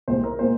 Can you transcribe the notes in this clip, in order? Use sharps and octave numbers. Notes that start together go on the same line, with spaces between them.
C2 A#2 G#3 C5
A#4
A#2 G#3 C5